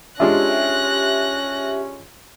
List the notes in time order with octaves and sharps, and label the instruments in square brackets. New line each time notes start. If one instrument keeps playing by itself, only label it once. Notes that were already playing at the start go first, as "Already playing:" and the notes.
[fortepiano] G#3 D4 F4 [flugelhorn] C#4 [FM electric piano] G4 E5 [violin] F#6 A#6